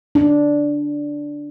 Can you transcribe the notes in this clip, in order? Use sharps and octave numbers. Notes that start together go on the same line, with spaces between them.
D4